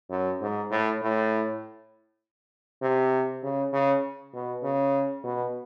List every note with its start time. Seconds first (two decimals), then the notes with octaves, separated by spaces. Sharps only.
0.10 F#2
0.41 G#2
0.71 A2
1.01 A2
2.82 C3
3.43 C#3
3.73 C#3
4.33 B2
4.63 C#3
5.24 B2